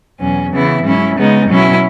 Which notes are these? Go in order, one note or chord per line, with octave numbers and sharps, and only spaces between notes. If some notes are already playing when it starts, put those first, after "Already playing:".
E2 B2 F#3 C#4
C#3 E3 B3 E4
G#2 F#3 C#4 E4
C#3 G#3 B3 D#4
B2 F#3 C#4 E4